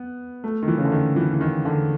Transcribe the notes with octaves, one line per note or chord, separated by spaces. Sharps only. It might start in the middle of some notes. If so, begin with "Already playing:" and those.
Already playing: B3
A3
D#3
E3
C#3
D3
D#3
E3
E3
D#3
D3